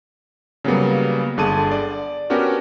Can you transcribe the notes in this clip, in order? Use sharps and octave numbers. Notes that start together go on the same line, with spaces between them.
C#3 F#3 G3 A#3 B3
G1 D3 G#4 A5 D#7
D5
B3 C#4 D4 F#4 G4 A#4